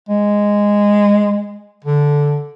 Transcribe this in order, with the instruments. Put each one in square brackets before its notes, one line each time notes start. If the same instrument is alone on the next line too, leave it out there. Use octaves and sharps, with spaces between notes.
[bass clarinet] G#3
D3